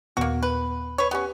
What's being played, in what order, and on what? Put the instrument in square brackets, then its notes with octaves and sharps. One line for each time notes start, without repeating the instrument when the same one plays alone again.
[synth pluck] D#2 A#2 B3 [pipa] A#3 F#4
[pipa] B4
B4 C#5
[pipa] B3 C#4 [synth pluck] G4 B4